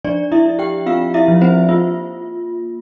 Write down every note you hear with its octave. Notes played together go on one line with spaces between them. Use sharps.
F3 D4 D5
E4 E5
E4
G4 G5
C4 F4 F5
E4 E5
F3
C4 C5
A#3 F4